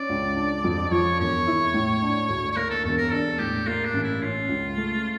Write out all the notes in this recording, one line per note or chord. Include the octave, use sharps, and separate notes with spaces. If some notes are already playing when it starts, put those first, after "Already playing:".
Already playing: C#4 D5
C#2
D4
F2
F3 C#5
E1 C#5
E4
A2
D4
D2
C#5
A#3 A#4
A4
E1 A4
A#4
D4 A4
A2 G4
A#3 F4
D4
A1
E4
C#4 F4
C#2
A3